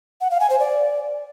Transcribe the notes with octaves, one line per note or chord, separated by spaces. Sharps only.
F#5
F5
G#5
C5
D5